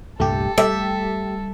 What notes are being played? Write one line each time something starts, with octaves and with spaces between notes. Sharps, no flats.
C2 G2 A#2 A3 G4 A4
G3 A3 G4 E5